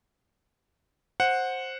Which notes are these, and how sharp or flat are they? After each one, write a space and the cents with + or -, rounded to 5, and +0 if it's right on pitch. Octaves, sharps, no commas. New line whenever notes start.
C5 +10 F#5 -10